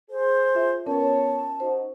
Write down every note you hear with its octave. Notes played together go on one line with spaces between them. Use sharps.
G#4 C5
F4 E5
B3 C#4 A#4 C#5 A5
D#4 F#4 C5